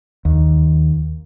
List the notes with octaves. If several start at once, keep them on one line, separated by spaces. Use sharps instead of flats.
D#2